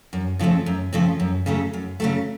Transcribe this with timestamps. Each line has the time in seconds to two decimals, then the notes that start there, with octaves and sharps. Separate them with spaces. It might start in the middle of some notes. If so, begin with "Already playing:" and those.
0.13 F#2
0.39 C#3 F3 A3 C4
0.66 F#2
0.93 C#3 F3 A3 C4
1.20 F#2
1.46 C#3 F#3 A3
1.73 F#2
2.00 C#3 F#3 A3